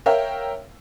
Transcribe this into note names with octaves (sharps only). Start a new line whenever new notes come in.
A#4 C#5 E5 F5 G5